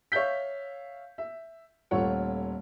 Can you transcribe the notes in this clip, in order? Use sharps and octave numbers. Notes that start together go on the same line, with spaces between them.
C#5 E5 F5 G6 B6
E5
D#1 A3 F4 C#5 F#5